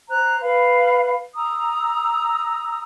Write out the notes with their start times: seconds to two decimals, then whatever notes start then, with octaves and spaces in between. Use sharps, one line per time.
0.09 C5 A#5 F#6
0.40 B4 F5 B5
1.36 A#5 D#6 E6